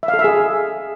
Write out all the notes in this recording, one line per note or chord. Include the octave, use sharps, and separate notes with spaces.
E5
F5
A4
E5
G#4